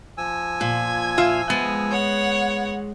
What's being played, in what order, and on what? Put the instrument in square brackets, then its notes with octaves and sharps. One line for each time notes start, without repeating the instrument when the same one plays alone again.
[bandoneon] F3 G#5 E6
[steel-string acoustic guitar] A#2 [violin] G#6
[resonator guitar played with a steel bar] F4 E5
[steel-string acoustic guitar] G#3 [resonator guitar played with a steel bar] B3
[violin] C#5 F#5